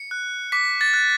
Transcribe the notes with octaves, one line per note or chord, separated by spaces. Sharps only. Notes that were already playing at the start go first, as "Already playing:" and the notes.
Already playing: C#7
F#6
D6 B6
A6
F#6